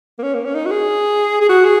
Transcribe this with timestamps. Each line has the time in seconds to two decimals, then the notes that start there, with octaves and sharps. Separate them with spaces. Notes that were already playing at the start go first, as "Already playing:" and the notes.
0.19 A#3
0.23 C#4
0.34 A#3
0.45 C#4
0.55 D#4
0.66 F#4
0.70 G#4
1.41 G#4
1.49 F#4
1.64 G#4